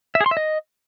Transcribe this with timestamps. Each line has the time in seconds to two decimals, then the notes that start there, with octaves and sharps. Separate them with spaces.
0.15 E5
0.21 G#4
0.26 C6
0.31 E5
0.37 D#5